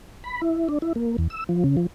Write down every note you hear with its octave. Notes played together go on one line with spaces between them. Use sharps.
B5
E4
D4
E4
A#3
E2
E6
F3
C#3
F3